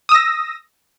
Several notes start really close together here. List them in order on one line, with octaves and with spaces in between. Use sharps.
D#6 E6 A#6